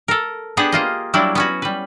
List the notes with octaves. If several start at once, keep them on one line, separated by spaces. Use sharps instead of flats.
A4 A#4
B3 D4 G4 G#4 F#5
A#3 F4 D#5
F#3 G3 A#3 D4 E4
B3 C#4 F#4
G3 B4